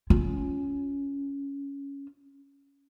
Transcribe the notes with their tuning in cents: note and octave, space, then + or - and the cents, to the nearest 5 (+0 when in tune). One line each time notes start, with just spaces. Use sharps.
C#4 +10 F4 +0